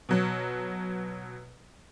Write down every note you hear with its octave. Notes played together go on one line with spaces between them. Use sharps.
B2 F#3